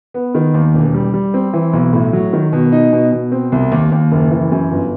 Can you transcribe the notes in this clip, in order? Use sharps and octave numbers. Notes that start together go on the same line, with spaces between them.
B3
D#3
D#2
E1
G3
G3
C4
E3
B1
A2
F#3
D#3
B2
D#4
B2
B2
C4
C2
D#2
D#2
F#1
E3
F#2
G1